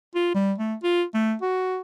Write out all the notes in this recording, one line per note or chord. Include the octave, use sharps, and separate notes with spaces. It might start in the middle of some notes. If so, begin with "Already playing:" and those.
F4
G3
A3
F4
A3
F#4